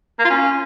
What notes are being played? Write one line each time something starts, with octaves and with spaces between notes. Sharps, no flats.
A#3
F4
C#4